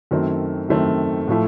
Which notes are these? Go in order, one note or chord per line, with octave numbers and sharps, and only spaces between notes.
F#2 D#3 A3 C4
F#2 D#3 A3 C4
A2 F3 A3